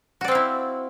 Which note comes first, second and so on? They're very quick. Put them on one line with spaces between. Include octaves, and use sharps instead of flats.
F#4 D5 C4 F5 E4